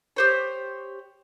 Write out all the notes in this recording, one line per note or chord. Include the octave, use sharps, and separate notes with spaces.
G4 C5 C#5